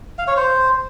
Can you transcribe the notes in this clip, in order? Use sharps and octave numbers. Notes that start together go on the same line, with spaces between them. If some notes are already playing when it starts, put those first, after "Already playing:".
F5
C#5
C5